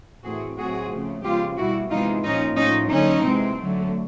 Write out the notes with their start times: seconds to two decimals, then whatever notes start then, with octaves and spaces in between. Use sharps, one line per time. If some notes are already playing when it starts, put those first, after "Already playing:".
0.24 A2 E3 A3 C4 F#4 G#4
0.58 A2 F#3 A3 C4 F#4 G#4
0.90 C#3 F3 A3
1.24 C#3 F3 G#3 B3 F4 G4
1.57 B2 G3 A#3 E4 F#4
1.90 C3 E3 G#3 B3 D#4 F4
2.24 A#2 F3 A#3 C#4 D#4
2.56 A2 F3 A#3 C#4 D#4
2.90 D3 F#3 A#3 C#4 D#4
3.23 C3 E3 G#3 C4
3.57 D3 F#3 A3